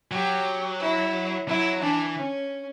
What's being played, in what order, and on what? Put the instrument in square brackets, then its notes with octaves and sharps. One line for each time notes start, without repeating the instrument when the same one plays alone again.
[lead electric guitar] F#3 [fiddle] G4
[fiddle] E4
[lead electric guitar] F#3 [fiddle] E4
[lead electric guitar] E3 [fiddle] D4
[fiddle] C#4